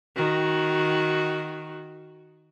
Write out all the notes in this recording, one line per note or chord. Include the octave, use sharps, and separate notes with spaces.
D#3 F#4